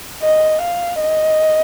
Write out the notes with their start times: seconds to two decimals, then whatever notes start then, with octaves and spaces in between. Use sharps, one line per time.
0.22 D#5
0.61 F5
1.01 D#5